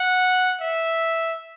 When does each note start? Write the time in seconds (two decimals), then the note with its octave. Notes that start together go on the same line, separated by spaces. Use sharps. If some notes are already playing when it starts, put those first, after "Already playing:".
Already playing: F#5
0.61 E5